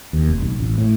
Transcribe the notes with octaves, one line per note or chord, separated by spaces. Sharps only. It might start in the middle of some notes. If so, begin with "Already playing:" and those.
D#2
F1
B1
A1
A2